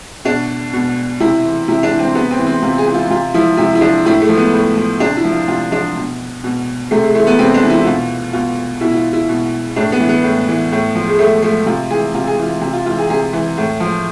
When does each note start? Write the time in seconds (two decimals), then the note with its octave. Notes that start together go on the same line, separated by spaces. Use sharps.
0.25 B2 D4
0.73 B2
1.20 C3 E4
1.45 E3
1.68 C3 E4
1.83 D4
1.91 E3
1.99 C4
2.15 C3 B3
2.31 C4
2.39 E3
2.47 C4
2.62 C3 F4
2.78 G#4
2.87 E3
2.94 F4
3.10 C3 F4
3.34 F3 E4
3.57 C3 E4
3.75 E4
3.81 F3 D4
4.05 A2 E4
4.21 A3
4.29 F3
4.37 B3
4.53 A2
4.77 F3
5.00 C3 D4
5.17 E4
5.24 F3
5.32 F4
5.48 C3 F4
5.72 F3 D4
5.97 B2
6.44 B2
6.91 C3 A3
7.03 G#3
7.15 E3 A3
7.27 B3
7.39 C3 C4
7.54 D4
7.63 E3
7.70 E4
7.80 E4
7.86 B2 F4
8.33 B2 F4
8.81 B2 E4
8.91 E4
8.97 F4
9.13 E4
9.29 B2
9.76 A2 D4
9.92 B3
10.00 E3
10.09 B3
10.24 A2
10.48 E3
10.72 A2
10.95 F3
11.08 G#3
11.19 A2 A3
11.42 F3 A3
11.66 C3 F4
11.91 E3 G#4
12.14 C3 F4
12.27 G#4
12.38 E3 F4
12.61 C3
12.73 F4
12.86 E3 F4
12.98 G#4
13.10 C3 G#4
13.33 E3
13.58 A2
13.80 F3